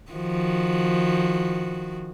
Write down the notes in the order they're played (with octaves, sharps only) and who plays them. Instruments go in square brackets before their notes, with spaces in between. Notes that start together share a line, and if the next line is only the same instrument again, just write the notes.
[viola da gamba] D#3 F3 F#4